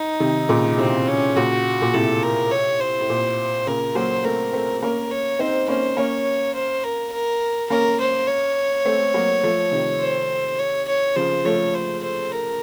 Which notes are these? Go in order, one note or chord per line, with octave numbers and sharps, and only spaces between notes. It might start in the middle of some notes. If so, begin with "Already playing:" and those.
Already playing: D#4
C3 D#3
A#2 C#3
A2 C3 C4
C#4
A#2 C#3 F#4
A#2
A2 C3 A4
A#4
C#5
C5
A2
A#2
A#2 C#3 A#4
F#3 A#3 C5
A3 C4 A#4
A3 C4
A#3 C#4 A#4
C#5
C4 D#4 C5
A#3 C#4 C5
A#3 C#4 C#5
C5
A#4
A#4
A#3 C#4 A#4
C5
C#5
A3 C4
F#3 A#3
F3 A3
C3 D#3
C5
C#5
C#5
C#3 F3 C5
F3 A3 C#5
C5
C5
A#4